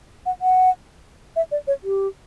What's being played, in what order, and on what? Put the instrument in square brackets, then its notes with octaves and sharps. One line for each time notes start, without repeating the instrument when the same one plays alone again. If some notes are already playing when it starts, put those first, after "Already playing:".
[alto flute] F#5
F#5
E5
D5
C#5
G4